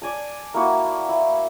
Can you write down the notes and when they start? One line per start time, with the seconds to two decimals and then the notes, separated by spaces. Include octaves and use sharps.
0.02 D5 G#5 A5
0.54 A#3 E4 F#4 A5
1.09 E4